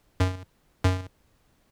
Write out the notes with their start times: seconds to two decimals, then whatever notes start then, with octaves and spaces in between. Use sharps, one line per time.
0.20 F#2
0.84 F#2